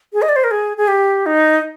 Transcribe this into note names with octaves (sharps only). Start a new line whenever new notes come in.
G#4
D#5
D5
C5
A#4
G#4
G#4
G4
D#4